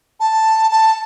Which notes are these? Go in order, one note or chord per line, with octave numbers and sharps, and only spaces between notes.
A5
A5